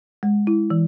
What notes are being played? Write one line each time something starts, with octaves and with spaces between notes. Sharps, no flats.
G#3
E4
E3